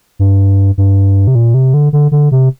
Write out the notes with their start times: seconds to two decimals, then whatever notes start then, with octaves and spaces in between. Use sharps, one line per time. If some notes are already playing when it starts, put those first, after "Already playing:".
0.19 G2
0.78 G2
1.27 C3
1.35 A#2
1.54 C3
1.74 D3
1.93 D3
2.12 D3
2.32 C3